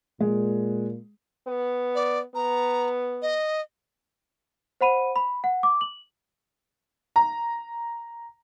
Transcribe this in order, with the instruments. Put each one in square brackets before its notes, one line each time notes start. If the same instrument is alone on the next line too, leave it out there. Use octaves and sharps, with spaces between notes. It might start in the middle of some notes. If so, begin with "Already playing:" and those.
[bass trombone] A#2 [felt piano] G#3
[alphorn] B3
[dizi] D5
[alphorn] B3 [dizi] A#5
[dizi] D#5
[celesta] C5 F#5 B5 D#7
B5
F#5
D6
F#7
[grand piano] A#5